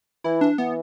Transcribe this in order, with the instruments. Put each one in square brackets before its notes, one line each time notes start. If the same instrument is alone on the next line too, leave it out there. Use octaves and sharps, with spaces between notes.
[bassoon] E3 [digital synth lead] E4
[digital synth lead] D4
[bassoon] E3 [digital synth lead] B3